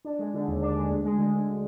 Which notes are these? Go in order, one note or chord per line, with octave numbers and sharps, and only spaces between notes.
D4
G#3
D3
D#2
D4
G#3
D2
G#3
D3
D2